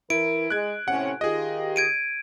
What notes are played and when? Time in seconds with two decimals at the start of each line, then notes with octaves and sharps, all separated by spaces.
0.10 E3 E4 A#4 D7
0.50 G#3 F#6 G#6
0.88 A2 C3 C#4 F#5
1.21 D#3 F4 G4 G#4 D#5
1.76 G#6 D7 D#7